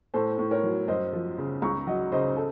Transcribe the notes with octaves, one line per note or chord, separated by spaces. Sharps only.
A2 A4 C5
A2
A#4 C#5
F#3
F#2 C5 D#5
F3
C#3
C#2 A#5 C#6
F#3 D#5 F#5
C#3 C5 D#5
A4